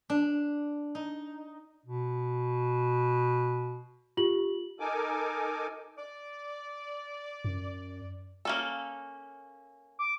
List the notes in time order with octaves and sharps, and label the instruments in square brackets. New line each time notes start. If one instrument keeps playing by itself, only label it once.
[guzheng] D4
D#4
[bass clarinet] B2
[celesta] F4 G4 F#7
[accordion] D#4 A4 A#4 G#5 D6
[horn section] D5
[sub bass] F#2
[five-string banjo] A#3 C#4 A4
[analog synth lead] D6